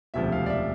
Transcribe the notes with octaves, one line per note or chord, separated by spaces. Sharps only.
E1 D2 C3 F3 E5
F5
D5
E5